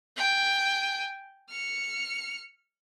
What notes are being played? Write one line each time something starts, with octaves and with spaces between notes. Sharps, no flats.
G5 G#5
F6 C#7